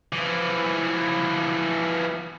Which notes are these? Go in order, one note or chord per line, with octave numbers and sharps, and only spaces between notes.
E3 F3